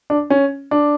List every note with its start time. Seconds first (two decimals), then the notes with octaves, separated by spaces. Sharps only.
0.10 D4
0.30 C#4
0.71 D4